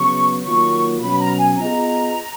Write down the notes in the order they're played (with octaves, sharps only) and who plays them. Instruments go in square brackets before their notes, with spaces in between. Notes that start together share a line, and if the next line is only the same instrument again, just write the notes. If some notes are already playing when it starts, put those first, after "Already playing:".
Already playing: [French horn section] C#3 F#3 B3 [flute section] C#6
[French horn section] D#3 F#3 A#3 F4 [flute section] C#6
[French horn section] B2 F#3 C#4 [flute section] B5
[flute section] A#5
G#5
[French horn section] B3 F4 G#4 D#5 [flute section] A#5